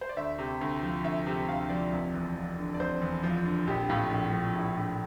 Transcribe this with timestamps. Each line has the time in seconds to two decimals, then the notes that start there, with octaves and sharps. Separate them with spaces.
0.01 C5
0.09 D5
0.17 D2 E5
0.39 C3
0.61 D2
0.82 F3
1.04 D2 E5
1.27 C3
1.47 D2 F5
1.69 F3 D5
1.92 F1
2.14 E2
2.35 F3
2.58 D3
2.74 D5
2.79 F1 C5
3.01 E2
3.23 F3
3.46 D3
3.67 A#1 G4
3.89 A2 F4
4.10 A#1
4.32 F3
4.55 A#1 E4
4.77 A2